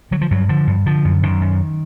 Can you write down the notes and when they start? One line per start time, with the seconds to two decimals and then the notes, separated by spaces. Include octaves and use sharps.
0.11 D3 F#3
0.21 F3
0.31 G2 F#3
0.49 D3 F3
0.67 G2
0.86 D3 F3
1.05 F#2
1.23 F#2 D#3
1.41 F#2